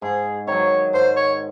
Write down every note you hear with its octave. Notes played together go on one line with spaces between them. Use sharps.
G#2 G#4
D#3 F#3 C#5
G#2 C5
C#5